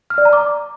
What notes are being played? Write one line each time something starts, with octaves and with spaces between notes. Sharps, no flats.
F6
D5
A#5
D6